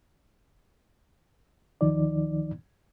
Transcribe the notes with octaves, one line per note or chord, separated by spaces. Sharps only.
D2 D#3 F3 D#4 D5